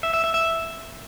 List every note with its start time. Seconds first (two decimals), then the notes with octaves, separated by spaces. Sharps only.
0.03 E5
0.14 E5
0.24 E5
0.34 E5